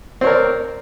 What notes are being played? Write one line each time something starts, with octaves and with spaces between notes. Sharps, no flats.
C4 A#4 C#5 D5